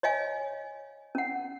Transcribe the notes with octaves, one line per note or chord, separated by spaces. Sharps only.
C#5 D#5 F5 G#5
C#4 F#5